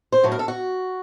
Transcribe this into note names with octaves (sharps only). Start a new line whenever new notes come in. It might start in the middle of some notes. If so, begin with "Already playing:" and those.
C5
A2 F#3 A3
A#4
A4
F#4